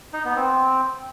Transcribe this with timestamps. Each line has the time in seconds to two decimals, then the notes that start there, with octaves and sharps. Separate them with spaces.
0.13 D#4
0.25 B3
0.36 C4